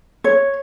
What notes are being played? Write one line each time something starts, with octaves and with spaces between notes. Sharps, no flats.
C#5